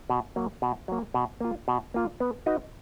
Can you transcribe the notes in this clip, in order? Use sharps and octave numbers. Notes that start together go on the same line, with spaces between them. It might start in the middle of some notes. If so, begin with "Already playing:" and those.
B2
F#3 A#3
B2
F#3 A#3
B2
A#3 F4
B2
A#3 F4
B3
D#4 F#4 B4 D#5